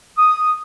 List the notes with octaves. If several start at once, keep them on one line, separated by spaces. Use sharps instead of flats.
D#6